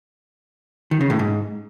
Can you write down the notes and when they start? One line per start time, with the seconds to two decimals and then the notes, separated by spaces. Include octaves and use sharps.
0.91 D#3
1.01 C#3
1.10 A2
1.19 G#2